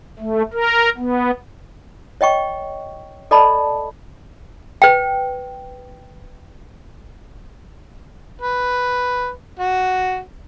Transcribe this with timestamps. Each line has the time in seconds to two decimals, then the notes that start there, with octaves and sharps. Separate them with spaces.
0.19 A3
0.53 A#4
0.98 B3
2.21 C#5 D#5 G5 C#6
3.31 A4 D5 D#5 A5 B5
4.82 B4 G5
8.41 B4
9.59 F#4